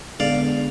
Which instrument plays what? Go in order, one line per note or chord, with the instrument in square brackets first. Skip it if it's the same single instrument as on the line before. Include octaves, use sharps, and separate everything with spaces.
[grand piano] D3 G#3 B3 [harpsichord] D5 F5